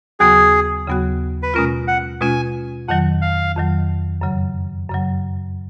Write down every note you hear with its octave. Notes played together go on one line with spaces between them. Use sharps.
D#2 C#3 F#3 B3 F#4 G#4
D#2 C#3 F#3 B3 F#4
B4
B2 G#3 C#4 F4 A#4
F#5
B2 G#3 C#4 F4 G#5
F2 D#3 F#3 F#5
F5
F2 D#3 F#3
F#2 C#3 F#3
F#2 C#3 F#3